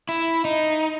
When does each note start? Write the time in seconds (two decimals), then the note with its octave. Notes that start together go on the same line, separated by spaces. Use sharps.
0.09 E4
0.45 D#4